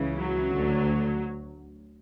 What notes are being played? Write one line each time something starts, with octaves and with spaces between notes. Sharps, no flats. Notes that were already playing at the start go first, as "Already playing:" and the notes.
Already playing: C#2 C#3 E3
F#3
D2 D3